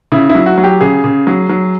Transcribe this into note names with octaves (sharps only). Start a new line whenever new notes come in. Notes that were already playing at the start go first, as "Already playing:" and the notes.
C#3 E4
E4
F#3
F#4
F#3
G4
C#3 G#4
C#3
F#3
F#3